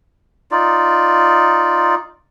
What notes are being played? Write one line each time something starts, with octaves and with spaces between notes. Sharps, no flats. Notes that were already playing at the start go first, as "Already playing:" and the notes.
D#4 F4 D5